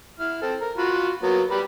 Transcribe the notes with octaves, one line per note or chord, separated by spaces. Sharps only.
E4 F6
C4 A4
A#4
F4 F#4 B5
F#3 A#3 B3
G3 B4 B5